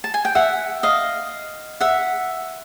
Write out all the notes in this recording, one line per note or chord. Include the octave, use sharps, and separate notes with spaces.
A5
G#5
G5
E5 F#5
D#5 F5
E5 F#5